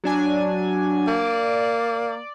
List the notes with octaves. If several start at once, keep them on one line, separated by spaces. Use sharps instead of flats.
F#3 D4 G#5
A#3 D5